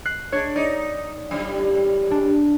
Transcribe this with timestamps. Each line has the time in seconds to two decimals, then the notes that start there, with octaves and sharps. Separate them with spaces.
0.05 F#6 C7
0.32 D4 C#5 G#6
0.56 D#4 D5
1.31 F#2 A2 G3
2.11 D4